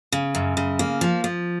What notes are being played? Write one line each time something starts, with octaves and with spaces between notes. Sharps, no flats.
C#3
F#2
C#3
A#3
F3
F3